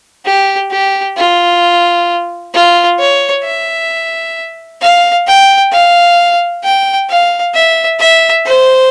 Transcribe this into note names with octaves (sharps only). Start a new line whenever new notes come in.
G4
G4
F4
F4
C#5
E5
F5
G5
F5
G5
F5
E5
E5
C5